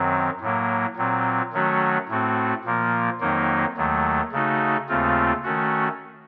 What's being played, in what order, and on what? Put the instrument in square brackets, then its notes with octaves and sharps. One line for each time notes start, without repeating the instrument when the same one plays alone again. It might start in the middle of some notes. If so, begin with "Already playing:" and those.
Already playing: [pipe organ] F#2 D#3 F#3 C4
A2 F#3 A#3
A#2 F#3 C4
D#3 F#3 A3 C#4 F#4
A2 A3 C4 F#4
A#2 F3 A#3
F2 D#3 F#3 A#3 D#4
D#2 D#3 F#3 A3
C#3 A3 D#4 F#4
D#2 C#3 A3 C4 F4
D#3 A3 C#4 F#4